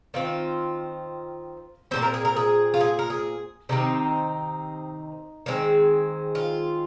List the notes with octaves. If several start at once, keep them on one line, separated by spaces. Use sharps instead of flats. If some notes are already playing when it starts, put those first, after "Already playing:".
D#3 C4 F4
A#2 F3 C4 C5
A#4
G#4
A#4
G#4
F4
G#4
A#4
G#4
C3 D#3 C4 D#4
D#3 G#3 C4
F4